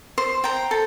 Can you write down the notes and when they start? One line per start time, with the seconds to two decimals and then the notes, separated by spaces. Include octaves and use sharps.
0.18 C5
0.44 G5 A#5
0.71 A4